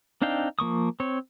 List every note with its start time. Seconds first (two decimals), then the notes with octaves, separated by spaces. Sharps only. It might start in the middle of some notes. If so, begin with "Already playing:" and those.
0.22 C4 D4 D#4 F5 G5
0.59 F3 A#3 C#6 D#6
1.00 C4 C#5